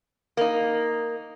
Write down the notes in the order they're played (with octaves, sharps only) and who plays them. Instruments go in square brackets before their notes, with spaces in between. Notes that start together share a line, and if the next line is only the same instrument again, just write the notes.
[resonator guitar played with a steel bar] A#3 D#4